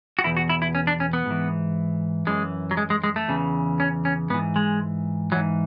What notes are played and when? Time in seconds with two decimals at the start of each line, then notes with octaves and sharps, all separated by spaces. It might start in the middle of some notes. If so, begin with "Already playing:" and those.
0.19 F#4
0.24 E2 B2 E4
0.37 F#4
0.50 E4
0.62 E4
0.75 C#4
0.87 D4
1.00 C#4
1.13 B3
1.26 G#2 E3
2.27 F#2 E3 G#3
2.71 F#3
2.77 G#3
2.90 G#3
3.04 G#3
3.16 A3
3.28 E2 C#3 E3
3.80 C#4
4.05 C#4
4.30 G#2 B3
4.34 E3
4.56 G#3
5.32 G#2 E3 F#3